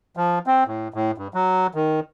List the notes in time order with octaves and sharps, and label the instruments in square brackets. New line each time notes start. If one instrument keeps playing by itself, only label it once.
[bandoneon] F3
C4
A2
A2
G2
F#3
D#3